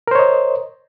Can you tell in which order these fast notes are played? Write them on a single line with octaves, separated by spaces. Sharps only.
A#4 C5 C#5 D#5